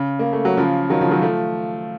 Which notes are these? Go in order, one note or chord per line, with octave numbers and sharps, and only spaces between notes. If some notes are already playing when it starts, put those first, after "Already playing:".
Already playing: C#3
A#3
A3
F#3
C#3 F3
D#3 F#3
C#3 F3
D#3 F#3
F3 A3